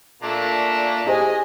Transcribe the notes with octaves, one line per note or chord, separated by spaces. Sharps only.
A#2 A3 A#3 D4
E4 G4 G#4 C5 D#5 G#5